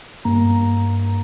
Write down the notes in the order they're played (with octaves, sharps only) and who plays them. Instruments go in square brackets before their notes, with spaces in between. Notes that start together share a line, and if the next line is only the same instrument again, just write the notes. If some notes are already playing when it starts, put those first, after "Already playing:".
[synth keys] G2 A#3 A#5